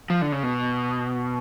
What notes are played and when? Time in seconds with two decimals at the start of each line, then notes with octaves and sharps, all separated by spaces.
0.10 F3
0.22 D3
0.32 C#3
0.43 B2